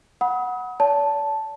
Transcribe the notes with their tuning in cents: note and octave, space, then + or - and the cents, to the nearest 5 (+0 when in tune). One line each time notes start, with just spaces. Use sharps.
F#5 +0 B5 -25 D#6 +35
D5 -45 A5 +0